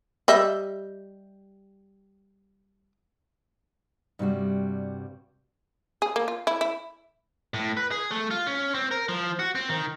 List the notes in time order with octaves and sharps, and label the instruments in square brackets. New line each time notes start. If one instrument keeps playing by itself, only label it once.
[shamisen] G3 D#5 E5
[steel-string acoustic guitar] G2 C3 G3 F#4
[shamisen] G#4
A#3
F4
E4
E4
[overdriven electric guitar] A2
B4
G#4
A3
F4
C#4
C4
A#4
F3
F#4
C4
D#3